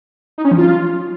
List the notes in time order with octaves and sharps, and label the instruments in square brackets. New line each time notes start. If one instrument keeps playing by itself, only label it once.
[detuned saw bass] D#4
C#4
F3
F4